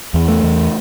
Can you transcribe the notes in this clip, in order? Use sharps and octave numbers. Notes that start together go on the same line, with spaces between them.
E2
A3
E2